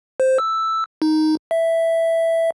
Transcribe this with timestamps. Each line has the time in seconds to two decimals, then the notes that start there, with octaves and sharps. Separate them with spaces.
0.20 C5
0.39 E6
1.02 D#4
1.51 E5